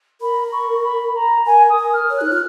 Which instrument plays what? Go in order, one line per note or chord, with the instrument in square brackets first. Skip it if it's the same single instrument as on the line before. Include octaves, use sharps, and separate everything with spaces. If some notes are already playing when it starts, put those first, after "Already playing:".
[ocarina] A#4 [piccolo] B5
[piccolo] C#6
B5
A#5
[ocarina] A#4 [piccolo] G#5
[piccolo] D#6
[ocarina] A#4
[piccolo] F6
[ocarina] C#5
[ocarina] D#4 [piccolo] F#6
[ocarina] F4 [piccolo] F6